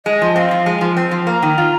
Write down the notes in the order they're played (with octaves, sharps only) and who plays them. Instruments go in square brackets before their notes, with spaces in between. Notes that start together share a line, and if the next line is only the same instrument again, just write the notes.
[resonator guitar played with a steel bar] G#3 [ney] D#5
[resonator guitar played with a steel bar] F3
[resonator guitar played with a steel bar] C4 [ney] F5
[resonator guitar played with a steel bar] F3
G#3
F3
C4
F3
[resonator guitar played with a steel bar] A#3 [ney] A#5
[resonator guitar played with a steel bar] D#3
F4